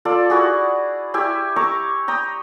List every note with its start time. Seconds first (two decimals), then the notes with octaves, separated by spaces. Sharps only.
0.05 F4 A4 D5
0.30 E4 F#4 G#4
1.14 E4 G4 E5 G#5
1.56 A#5 C#6 D6 E6
2.08 G5 A#5 D#6